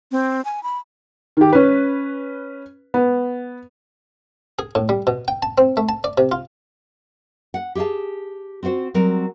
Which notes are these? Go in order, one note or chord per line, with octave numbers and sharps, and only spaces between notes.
C4
G#5
B5
D#3 G4
C#4 B4
B3
G#4
A2
G3
B2
G5
A5
C4
A3
A5
D5
C3
F4
F#5
G4 G#4 E5 F5 A5
C4 F4 F#4 C5
F#3 G3 C4 F#4 A#4